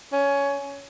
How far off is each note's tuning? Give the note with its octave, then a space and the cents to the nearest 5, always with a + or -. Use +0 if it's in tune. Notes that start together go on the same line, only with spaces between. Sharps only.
C#4 +15